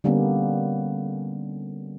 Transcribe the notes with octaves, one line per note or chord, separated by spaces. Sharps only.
D3 G3 A#3 B3 C#4